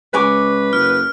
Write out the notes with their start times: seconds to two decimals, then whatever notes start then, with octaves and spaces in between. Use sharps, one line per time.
0.14 C#2 B4 G#5 C#6 D6
0.73 F#1 F6